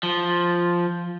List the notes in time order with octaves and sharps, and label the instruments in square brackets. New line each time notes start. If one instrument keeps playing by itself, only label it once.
[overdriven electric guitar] F3